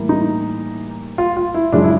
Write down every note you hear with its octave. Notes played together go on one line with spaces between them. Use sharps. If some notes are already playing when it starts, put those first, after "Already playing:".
Already playing: A2 E3 G3 A#3
D#4
F4
F4
E4
F#2 C#3 F3 G#3 D4
E4